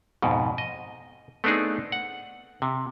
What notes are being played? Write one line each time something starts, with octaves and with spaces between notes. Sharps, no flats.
F2 G#2 B2
D#5
A3 B3 C4 D4 D#4 G#4
F#5
C3